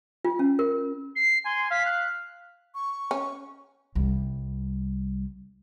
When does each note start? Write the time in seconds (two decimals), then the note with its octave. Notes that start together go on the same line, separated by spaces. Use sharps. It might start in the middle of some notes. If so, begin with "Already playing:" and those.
0.24 F4
0.39 C#4
0.59 A#4
1.16 C7
1.45 G#5 C6
1.71 F5 B6
1.85 F#6
2.75 C#6
3.11 C#4
3.95 C2 G3